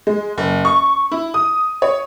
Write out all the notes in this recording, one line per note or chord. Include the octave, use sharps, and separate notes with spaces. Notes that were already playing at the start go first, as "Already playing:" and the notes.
G#3
F#1
C#6
E4
D#6
C#5